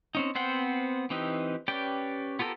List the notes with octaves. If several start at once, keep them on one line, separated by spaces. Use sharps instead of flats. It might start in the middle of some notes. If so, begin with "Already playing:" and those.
C4 C#4 D#4
B3 C4 C5 F#5 G5
E3 C4 D#4 G4 B4
C#4 G4 B4 D5 G5
B3 F4 G4 A4 A#4